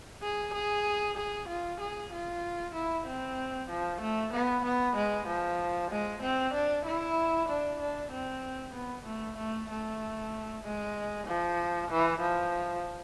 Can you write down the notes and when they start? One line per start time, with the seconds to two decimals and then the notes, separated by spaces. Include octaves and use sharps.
0.23 G#4
0.54 G#4
1.17 G#4
1.48 F4
1.80 G#4
2.12 F4
2.75 E4
3.06 C4
3.69 F3
4.01 A3
4.33 B3
4.64 B3
4.96 G#3
5.27 F3
5.91 G#3
6.22 C4
6.54 D4
6.85 E4
7.48 D4
7.80 D4
8.11 C4
8.74 B3
9.06 A3
9.37 A3
9.69 A3
10.63 G#3
11.27 F3
11.90 E3
12.21 F3